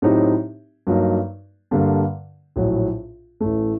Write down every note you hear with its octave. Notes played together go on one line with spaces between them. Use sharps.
A2 F#3 C4 D#4 G4
G2 F#3 A#3 D#4
G2 D3 G3 A#3
A#1 A2 F#3
A1 A2 A3